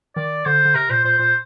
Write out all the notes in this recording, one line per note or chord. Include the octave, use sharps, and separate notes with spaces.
D#3 D5
D3 C5
D3
C3 A#4
A#2 C5
A#2 C5
A#2 C5